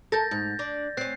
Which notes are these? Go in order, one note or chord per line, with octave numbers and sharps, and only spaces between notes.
A4 A#4 G6 A6 A#6
G#2 G6
D4
C4 C#4 F#6 C7